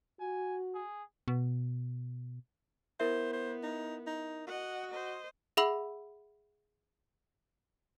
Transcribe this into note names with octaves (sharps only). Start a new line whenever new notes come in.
F#4 G#5
G#4
B2
B3 E4 A#4 C5 E5
C5
D#4
D#4
F#4 D#5 F#5
C5 D#5
G#4 E5 F#5 B5 E6 F#7